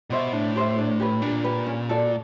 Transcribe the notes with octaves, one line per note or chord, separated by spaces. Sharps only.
B2 G4 C5 E5
A2 D4
G4 C5 E5
D4
G4 B4
A#2 D4
G4 B4
C#4
F#4 A4 D5